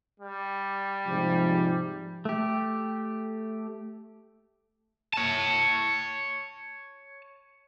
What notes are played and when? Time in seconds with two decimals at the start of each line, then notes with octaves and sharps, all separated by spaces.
0.20 G3
1.07 G#2 C3 F3
2.25 A3 G4
5.13 C#5 A5